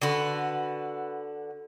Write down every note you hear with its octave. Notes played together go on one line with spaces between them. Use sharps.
D3 F#4 B4